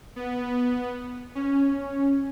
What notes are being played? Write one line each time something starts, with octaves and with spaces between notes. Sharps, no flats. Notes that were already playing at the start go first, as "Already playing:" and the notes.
B3
C#4